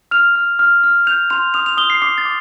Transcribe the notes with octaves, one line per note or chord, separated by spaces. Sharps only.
F6 F7
F6
F6
F6
G6 F7
C6 F7
D#6 F7
F7
D#6 G7
C7
D6 C7
A6
D6